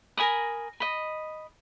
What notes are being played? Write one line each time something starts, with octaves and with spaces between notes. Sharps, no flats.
A#4 G#5 B5 D#6
D#5 B5